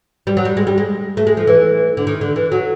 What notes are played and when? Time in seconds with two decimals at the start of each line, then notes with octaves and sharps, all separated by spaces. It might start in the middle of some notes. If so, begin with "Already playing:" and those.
0.27 G3
0.37 F#3
0.45 G3
0.57 G#3
0.67 G3
0.78 G#3
1.17 A3
1.27 G#3
1.37 F3
1.47 E3
1.97 D3
2.07 D#3
2.21 D3
2.36 E3
2.52 F#3